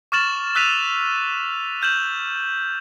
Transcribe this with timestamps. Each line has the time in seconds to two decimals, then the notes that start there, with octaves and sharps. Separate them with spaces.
0.12 C#6 D6 F6 A6 E7 F#7
0.55 E6 F#6 B6 D#7 F7
1.82 F6 G6 E7 F#7